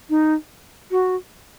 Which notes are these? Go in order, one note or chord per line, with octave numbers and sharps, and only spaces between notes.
D#4
F#4